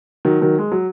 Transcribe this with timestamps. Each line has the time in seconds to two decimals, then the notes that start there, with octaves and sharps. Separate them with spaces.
0.25 D#3 F#3
0.41 D#3 F#3
0.58 G#3
0.72 F#3